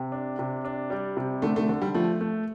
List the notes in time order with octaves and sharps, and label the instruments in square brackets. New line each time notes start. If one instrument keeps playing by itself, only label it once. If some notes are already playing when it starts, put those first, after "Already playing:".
Already playing: [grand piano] C3
D4
C3
D4
G3
C3
[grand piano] D3 [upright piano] A3
[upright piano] A3
[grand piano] D3
[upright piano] G3
[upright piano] F3 [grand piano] A3
[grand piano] A3